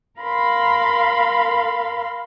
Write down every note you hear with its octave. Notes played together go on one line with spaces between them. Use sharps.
A#4 F5 B5 C6